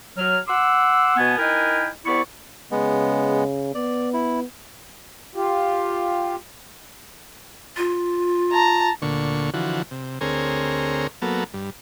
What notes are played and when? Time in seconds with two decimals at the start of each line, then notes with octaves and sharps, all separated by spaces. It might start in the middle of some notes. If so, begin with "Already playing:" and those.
0.17 F#3 F6
0.47 F#5 C6 D6 E6
1.16 B2 B3 G#5
1.38 D#4 E4 A#4 B4 G5 G#5
2.06 C2 B3 E4 D5 C#6
2.71 C#3 G#3 B3
3.75 B3 D5
4.13 E4
5.35 F4 G4
7.77 F4
8.52 A5 A#5
9.02 D2 A#2 D3 C#6
9.54 D3 E3 F3 F#4
9.91 C3
10.21 D2 C4 G#4 A#4 C#5
11.22 F#3 A#3 B3 A4
11.54 G2